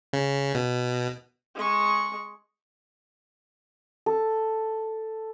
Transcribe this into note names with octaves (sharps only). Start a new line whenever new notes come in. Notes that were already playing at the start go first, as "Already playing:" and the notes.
C#3
B2
G#3 C#6
A4